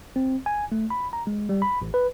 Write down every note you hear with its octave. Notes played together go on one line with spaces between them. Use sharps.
C4
G#5
A3
B5
A#5
G#3
G3
B5
A1
B4